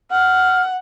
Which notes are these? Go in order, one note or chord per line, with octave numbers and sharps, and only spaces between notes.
F#5 F6